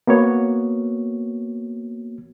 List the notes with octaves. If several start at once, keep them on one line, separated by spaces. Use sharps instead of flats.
A#3 B3 F#4 C#5